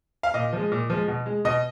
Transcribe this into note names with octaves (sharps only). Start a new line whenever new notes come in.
F5
A#2 D#5
F3 G#3
A#2
F3 G#3
B2
G#3
B2 D#5